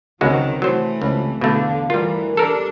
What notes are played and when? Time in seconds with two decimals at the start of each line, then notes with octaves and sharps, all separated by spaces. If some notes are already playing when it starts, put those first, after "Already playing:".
0.21 C#2 C3 D#3 F#3 G#3 F#4
0.62 E3 F#3 A3 C5
1.02 C#2 C3 F3
1.41 E2 B2 D3 A3 F5
1.90 D2 G2 E3 G3 F4 A#4
2.37 G3 D4 A4 A#4